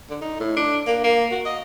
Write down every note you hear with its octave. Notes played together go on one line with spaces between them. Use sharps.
D3
D#4
A2
D4
A#3
A#3
F#4
D#5